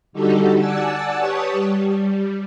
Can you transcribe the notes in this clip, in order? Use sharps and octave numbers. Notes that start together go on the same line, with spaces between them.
D3 G3 D#4 F#4 G4 A4
D5 F#5 G#5 A5 E6 A6
G4 B4 C#5 A5 C#6 D#6
G3